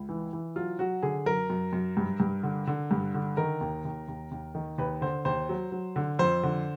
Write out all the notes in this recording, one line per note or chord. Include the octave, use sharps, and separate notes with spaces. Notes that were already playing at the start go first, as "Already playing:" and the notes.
Already playing: C#2
E3
E3
F#3 F4
F#3 F#4
D3 G#4
F#2 A#4
F#2
F#2
G2
G2
D3
D3
G2
D3
D#3 A#4
D#2
D#2
D#2
D#2
D#3
D#2 B4
D3 C5
D#2 C5
F#3
F#3
D3
F2 C5
D3